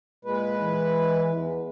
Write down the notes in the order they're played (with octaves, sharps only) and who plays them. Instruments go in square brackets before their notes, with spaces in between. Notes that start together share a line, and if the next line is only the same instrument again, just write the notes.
[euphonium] A#2 [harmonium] G#3 B4
[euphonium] E3
E2